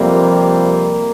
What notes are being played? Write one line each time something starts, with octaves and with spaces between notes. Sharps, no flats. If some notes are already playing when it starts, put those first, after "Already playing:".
Already playing: F2 C3 G3 A#3